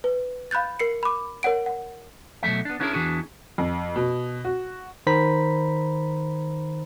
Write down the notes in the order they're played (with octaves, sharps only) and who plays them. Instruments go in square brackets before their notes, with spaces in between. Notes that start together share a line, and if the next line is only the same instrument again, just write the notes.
[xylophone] B4
F5 B5 F#6 G6 A6
A#4 C7 C#7
B5 D6
A#4 C#5 F#5 D7
F#5
[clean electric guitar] B2 F#3 G#3 A3 E5
B3 D4
B3 C#4 D4 E4 G#4 A#4
E2 E3 D4 F#4 G#4
[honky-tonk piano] F2
B2
F#4
[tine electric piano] D#3 C5 A#5 B5 B6